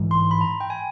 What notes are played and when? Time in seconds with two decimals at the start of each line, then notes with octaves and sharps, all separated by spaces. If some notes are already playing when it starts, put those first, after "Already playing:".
Already playing: G#2 E3 G#3
0.11 C6
0.31 B5
0.41 A#5
0.61 G5
0.70 G#5